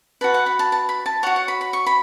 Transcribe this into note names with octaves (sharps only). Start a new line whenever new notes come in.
F#4 B4 A5
F#5
B5
A5
A5
B5
A5
F#4 C#5 F#5
F#5
B5
B5
C#6
B5